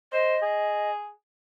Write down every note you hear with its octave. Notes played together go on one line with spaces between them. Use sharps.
C5 D#5
G#4